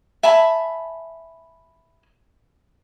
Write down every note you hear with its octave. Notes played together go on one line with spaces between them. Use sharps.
E5 G#5 A5 B5